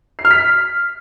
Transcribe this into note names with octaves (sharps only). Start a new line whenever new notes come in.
C7
F6
B6